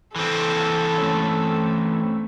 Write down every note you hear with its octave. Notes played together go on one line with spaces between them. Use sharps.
E3 C4 A4
A3 C#4